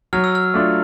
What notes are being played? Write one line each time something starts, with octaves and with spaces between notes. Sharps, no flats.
F#3 F6
E6
F6
A3 D4 F4